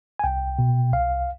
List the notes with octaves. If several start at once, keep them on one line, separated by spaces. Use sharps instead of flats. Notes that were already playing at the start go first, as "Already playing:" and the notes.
G#5
C2 G5
B2
C2 F5